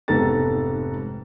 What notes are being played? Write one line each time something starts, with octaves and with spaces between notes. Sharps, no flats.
F1 G#2 B3 A4 A#5 A6